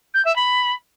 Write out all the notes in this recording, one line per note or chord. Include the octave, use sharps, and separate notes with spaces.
G6
E5
B5